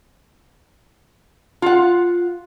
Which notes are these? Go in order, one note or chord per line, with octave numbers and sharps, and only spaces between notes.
F4 F#5